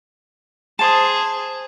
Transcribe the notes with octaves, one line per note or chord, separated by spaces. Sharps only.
G#4 C5 A5 C6 D#6